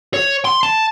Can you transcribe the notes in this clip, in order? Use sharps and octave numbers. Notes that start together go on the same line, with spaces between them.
C#5
C6
A5